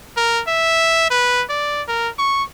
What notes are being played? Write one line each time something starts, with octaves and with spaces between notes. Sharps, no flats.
A#4
E5
B4
D5
A#4
C#6